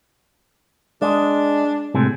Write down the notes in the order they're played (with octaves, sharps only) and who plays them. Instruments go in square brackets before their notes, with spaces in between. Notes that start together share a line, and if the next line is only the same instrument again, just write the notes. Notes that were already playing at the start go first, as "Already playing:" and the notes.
[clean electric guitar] G#3 [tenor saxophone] D4
[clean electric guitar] A2 C3 G#3